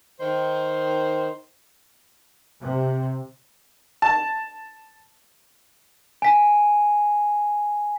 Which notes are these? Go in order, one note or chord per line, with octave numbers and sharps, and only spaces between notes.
D#3 C5
C3
A5
G#5 B6